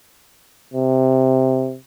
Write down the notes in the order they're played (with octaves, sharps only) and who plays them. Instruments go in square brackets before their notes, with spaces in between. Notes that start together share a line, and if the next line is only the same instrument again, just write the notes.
[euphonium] C3